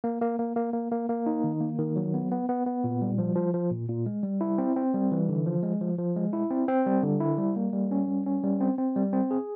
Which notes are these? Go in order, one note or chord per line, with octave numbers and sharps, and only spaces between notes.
A#3
A#3
A#3
A#3
A#3
A#3
A#3
D#4
D#3
A#3
D#3
F#3
B3
B3
B3
B3
A#2
G3
F3
F3
F3
A#2
A#2
G#3
G3
E4
C4
C4
G3
E3
D3
F3
G#3
F3
F3
G#3
E4
C4
C4
G3
D3
E4
G3
A#3
G3
C#4
G3
C#4
G3
C4
C4
G3
C4
G#4